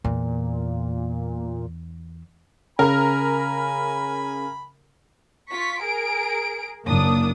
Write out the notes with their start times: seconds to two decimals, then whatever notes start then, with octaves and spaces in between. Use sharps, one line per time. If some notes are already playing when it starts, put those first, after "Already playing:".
0.04 E2 A#2
2.79 C#3 A#4 G#5 B5
5.48 F4 C#6 B6
5.80 G#4 A#4 D7
6.85 F#1 A#3 D4 D#6